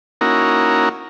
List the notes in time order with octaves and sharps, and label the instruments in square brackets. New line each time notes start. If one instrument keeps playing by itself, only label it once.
[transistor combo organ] A#3 C#4 D#4 E4 F#4 A#4